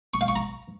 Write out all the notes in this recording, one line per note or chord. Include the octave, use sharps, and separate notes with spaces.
C#6
F5
C#6
A#5